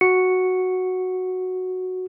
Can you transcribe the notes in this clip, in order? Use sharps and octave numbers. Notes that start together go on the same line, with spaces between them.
F#4 C#7